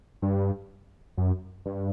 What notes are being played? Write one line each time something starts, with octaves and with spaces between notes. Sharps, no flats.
G2
F#2
G2